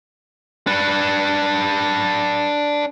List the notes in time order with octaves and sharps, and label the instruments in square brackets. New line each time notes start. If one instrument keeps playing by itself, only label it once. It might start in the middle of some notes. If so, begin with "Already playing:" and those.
[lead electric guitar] D4 B4